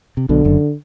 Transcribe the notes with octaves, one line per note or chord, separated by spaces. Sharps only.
C3
B1 B2 D3
F#1 F#2